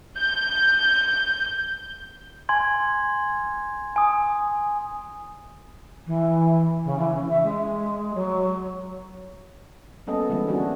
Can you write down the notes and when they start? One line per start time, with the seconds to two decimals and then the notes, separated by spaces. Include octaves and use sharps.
0.18 G6
2.49 G#5 C6 G#6
3.96 G#5 D#6
6.06 E3
6.84 C#3
6.98 E3
7.14 C#4
7.29 E5
7.43 G#3
8.14 F#3
10.07 G3 A#3 B3 C#4 A4 D#5
10.29 D3 E3 G3 G#3 E4
10.48 G3 C#4 D4 F#4